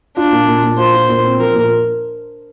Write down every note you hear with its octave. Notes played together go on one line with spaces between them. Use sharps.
D4 F4
A#2
A#2
A#2
F4 C5
A#2
A#2
C4
F3 A#4
A#2